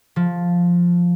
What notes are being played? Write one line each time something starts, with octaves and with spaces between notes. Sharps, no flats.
F3